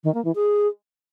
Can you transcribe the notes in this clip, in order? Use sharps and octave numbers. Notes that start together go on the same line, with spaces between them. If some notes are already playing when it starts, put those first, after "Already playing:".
D#3
A#3
E3
G#4